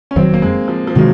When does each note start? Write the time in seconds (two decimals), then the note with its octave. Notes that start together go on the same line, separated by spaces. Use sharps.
0.11 C#4
0.16 F1 F2 D#3 F#3 C4
0.34 A#3
0.42 G#3
0.68 F3
0.87 F3
0.95 C3 D#3 F#3 G#3